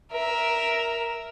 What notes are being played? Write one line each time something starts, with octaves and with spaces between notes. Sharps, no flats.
A#4 E5